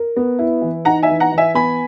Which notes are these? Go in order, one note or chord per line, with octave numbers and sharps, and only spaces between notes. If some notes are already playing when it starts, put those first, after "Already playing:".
Already playing: A#4
B3
E4
E3
D#4 F#5 A#5
E5 G#5
E3
F#5 A#5
E3
E5 G#5
B3 G#5 B5